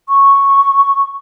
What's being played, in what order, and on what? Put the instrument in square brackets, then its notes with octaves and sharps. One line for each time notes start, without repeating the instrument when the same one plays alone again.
[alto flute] C#6